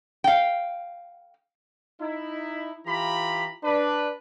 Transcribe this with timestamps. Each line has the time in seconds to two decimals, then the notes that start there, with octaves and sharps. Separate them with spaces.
0.24 F5 G5
2.00 D#4 E4
2.86 E3 F4 G4 A#5 B5
3.64 D4 B4